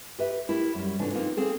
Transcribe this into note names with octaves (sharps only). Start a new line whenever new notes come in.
G4 B4 E5
A3 E4 G4 A#4 E5
F#2 G3
G#2 C3 E3 F3 A3 D4
A#3 C4 D#4 F4 A#4 B4
A#3 C4 G#4 A4